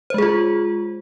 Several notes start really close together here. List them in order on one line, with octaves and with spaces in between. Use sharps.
C5 G#3 G#4 F4